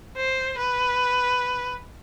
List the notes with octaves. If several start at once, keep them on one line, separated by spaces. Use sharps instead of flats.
C5
B4